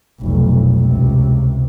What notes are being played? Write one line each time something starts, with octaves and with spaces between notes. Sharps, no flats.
F1 B1
C#2 C3